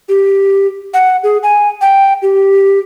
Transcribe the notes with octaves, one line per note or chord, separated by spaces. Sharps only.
G4
F#5
G#4
G#5
G5
G4